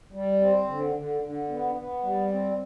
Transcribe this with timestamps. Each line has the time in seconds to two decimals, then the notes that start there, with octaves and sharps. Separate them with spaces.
0.13 G3
0.40 C4
0.67 D3
0.95 D3
1.22 D3
1.49 B3
1.76 B3
2.03 G3
2.30 C4